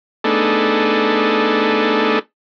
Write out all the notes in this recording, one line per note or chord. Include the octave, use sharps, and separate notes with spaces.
A3 B3 D4 D#4 G#4 A4